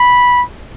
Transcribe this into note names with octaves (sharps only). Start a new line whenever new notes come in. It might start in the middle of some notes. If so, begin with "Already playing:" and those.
Already playing: B5